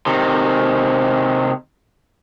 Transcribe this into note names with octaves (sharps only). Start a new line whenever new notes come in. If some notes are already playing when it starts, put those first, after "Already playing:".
C3 D#3